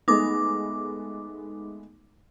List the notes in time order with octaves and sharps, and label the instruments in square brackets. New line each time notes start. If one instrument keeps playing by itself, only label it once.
[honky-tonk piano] G#3 A3 B3 [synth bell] D#4 D6